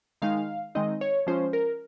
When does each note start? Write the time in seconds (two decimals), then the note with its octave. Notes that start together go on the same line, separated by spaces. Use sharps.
0.22 D#3 G#3 D#4 F5
0.75 D#3 G#3 C4 D#4 D#5
1.01 C#5
1.27 F3 G#3 C#4 F4 C5
1.53 A#4